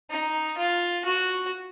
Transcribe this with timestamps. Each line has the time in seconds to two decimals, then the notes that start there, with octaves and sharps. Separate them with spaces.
0.10 D#4
0.58 F4
1.05 F#4